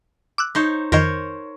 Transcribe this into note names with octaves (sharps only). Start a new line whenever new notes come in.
D6 E6 F#6
D#4 C5 C#5
F2 D#3 A#4 C5 C#5